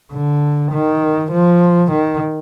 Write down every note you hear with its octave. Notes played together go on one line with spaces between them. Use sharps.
D3
D#3
F3
D#3